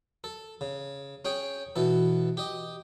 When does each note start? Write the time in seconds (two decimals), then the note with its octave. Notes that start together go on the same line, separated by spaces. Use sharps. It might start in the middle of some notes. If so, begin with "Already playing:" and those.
0.24 A4
0.61 C#3
1.25 C#4 G#4 G5
1.76 B2 E3 A4
2.37 G4 D#5